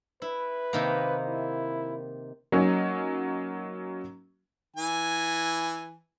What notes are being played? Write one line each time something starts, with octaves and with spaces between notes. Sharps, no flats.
E4 B4
C3 D#3 A#3
E4
F#3 A#3 C#4 D#4
E3 G#5